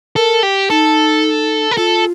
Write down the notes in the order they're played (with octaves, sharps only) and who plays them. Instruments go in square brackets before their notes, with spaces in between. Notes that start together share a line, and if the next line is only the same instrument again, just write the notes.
[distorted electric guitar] A4 [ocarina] A#4
[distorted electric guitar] G4
[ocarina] D#4 [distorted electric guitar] A4
[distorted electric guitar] A#4
[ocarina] F4 [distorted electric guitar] A4